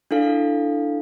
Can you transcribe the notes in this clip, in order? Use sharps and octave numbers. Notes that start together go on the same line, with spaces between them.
D4 E4 A4 F5